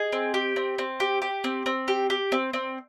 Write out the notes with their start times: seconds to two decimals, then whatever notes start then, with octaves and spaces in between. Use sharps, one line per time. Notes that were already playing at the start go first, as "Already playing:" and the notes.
Already playing: G#4 D#5
0.13 C4
0.34 G4
0.56 C4
0.78 C4
1.00 G4
1.22 G4
1.44 C4
1.66 C4
1.88 G4
2.10 G4
2.32 C4
2.53 C4